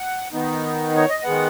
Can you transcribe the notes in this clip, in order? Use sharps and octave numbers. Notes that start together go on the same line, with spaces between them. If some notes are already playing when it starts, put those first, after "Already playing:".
Already playing: F#5
D#3 B3 D#4
C#5
D#5
D#3 G#3 B3 F#5